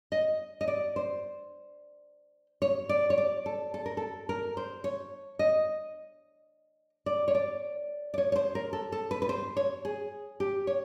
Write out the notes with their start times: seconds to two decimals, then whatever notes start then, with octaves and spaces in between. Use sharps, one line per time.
0.12 D#5
0.61 D#5
0.68 D5
0.96 C5
2.62 C#5
2.89 D5
3.10 C#5
3.18 D5
3.46 A4
3.74 A4
3.86 A#4
3.97 A4
4.29 A#4
4.57 C5
4.84 C#5
5.39 D#5
7.06 D5
7.28 C#5
7.35 D5
8.14 D5
8.18 C#5
8.32 C#5
8.36 C5
8.55 A#4
8.73 A4
8.92 A4
9.11 B4
9.22 B4
9.29 C5
9.57 C#5
9.85 G#4
10.40 G4
10.67 C#5